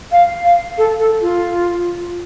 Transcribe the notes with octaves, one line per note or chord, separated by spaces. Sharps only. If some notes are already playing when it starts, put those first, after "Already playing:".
F5
F5
A4
A4
F4